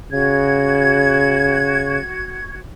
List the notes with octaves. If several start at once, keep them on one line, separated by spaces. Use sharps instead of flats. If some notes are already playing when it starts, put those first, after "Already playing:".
C#3 F#4 G#6